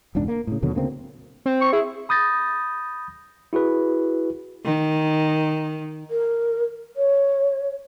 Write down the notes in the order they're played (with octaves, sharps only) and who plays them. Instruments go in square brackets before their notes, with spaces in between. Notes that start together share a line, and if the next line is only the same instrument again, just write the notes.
[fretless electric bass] E1 C#2 G#2 D4
A#3
A2 C#3
D#2 B2 D3 F#3
D2 C#3 A#3 C4
[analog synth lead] C4
[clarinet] C#6
[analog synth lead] E4 [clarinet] G#4
[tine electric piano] B5 D#6 G6 A6 A#6
E4 F#4 G#4 B4
[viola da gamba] D#3
[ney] A#4
C#5